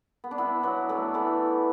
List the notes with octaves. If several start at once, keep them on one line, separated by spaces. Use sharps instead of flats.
B3
D4
B3 E4
F#3 B3
E3 A3
E3 A3